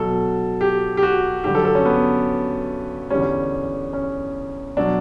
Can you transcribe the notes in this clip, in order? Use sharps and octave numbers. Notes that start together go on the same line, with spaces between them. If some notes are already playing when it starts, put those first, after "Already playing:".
Already playing: B2 F#3 A4
G4
G4
F#4
G2 D3 F#3 G4
A4
A4
C#4
B3
E2 D3 G3 C#4
C#4
B2 F#3 D4